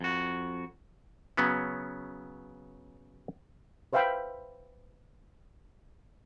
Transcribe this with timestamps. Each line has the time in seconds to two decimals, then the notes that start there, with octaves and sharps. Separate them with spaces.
0.01 F2 F#4
1.37 C#3 F#3 B3 C#4
3.93 B4 C5 E5 F5 G5 B5